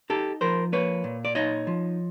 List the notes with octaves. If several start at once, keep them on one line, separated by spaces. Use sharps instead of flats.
D#4 G4 A4
F3 A#4 C5
A#3 B4 C#5
A#2
D5
D#4 C#5 D#5
F3